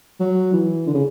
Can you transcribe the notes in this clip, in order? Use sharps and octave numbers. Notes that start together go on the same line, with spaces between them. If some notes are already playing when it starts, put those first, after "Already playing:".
F#3
E3
D3
C#3